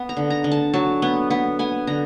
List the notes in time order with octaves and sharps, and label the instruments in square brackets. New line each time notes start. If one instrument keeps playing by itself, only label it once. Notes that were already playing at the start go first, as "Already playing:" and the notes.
Already playing: [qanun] B3
A#5
D3
A#5
D3
A5
F#3 A5
B3
B3
B3 G#5
D3 A#5